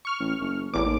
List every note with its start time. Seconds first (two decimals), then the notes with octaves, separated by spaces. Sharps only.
0.05 C#6 F6
0.20 A1
0.41 F#1
0.74 A1 E2 D6
0.86 D#2